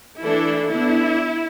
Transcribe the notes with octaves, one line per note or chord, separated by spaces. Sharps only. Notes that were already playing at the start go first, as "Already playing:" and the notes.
E3 A3 D4 E4 A4
D3 B3 D4 E4